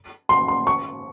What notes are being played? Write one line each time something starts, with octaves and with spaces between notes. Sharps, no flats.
C6
C6
C#6